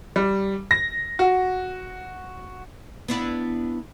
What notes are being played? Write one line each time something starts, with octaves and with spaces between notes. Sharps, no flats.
G3
A#6
F#4
B3 D4 E4